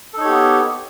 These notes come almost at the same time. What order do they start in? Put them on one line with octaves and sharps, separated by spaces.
A4 D#4 C#5 G4 B3